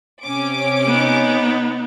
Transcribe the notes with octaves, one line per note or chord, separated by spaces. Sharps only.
C3 C#4 D6
B3 D#4